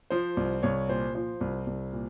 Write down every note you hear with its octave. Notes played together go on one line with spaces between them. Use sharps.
F3 C5
C2
C2 C#5
A#2 C5
F3 C5
C2
C2
A#2